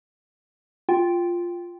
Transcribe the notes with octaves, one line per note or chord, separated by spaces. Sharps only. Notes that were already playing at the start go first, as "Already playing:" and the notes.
F4 G5